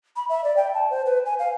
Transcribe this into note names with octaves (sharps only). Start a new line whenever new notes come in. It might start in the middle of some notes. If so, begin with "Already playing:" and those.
B5
E5
D5
G5
A5
C5
B4
G#5
F5